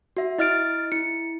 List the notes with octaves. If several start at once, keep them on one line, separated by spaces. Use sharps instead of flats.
F#4 E5
E4 D#5 F6 A6 D7
E4 C#7